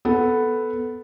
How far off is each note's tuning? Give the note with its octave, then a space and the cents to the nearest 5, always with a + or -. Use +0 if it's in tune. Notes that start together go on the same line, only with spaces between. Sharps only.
B3 +0 A4 -5